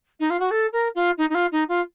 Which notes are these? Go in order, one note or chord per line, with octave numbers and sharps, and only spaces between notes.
D#4
F4
F#4
A4
A#4
F4
D#4
D#4
F4
D#4
F4